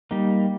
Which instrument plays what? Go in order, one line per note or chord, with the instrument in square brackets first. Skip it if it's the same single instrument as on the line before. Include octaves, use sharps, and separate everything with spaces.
[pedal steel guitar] G3 A#3 D#4